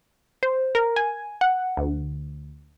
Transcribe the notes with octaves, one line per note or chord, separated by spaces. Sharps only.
C5
A#4
G#5
F#5
D2